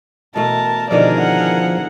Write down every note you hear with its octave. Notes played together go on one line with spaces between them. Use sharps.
B2 E3 A3 A#4 A5
B2 D3 D#3 F3 E4 G#4 A#4 D5
F#5